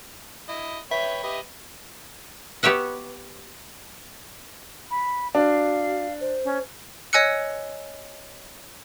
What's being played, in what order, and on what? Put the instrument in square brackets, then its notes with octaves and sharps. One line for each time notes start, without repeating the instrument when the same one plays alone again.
[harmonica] E4 D#5
[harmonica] B4 C#5 G5 [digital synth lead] E5
[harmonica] G4 B4 D#5
[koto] B3 G4 C#5 E5 F#5
[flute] B5
[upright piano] D4 [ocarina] F#4 [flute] F5
[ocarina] C5
[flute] C#4
[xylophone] C#5 D#5 G#5 E6 F#6 C#7